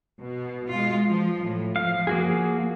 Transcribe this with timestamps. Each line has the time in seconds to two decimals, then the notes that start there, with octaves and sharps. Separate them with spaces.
0.19 B2
0.69 G#3 F4
1.10 F3
1.46 A2
1.76 F3 F5
2.07 A#3 F#4 G#4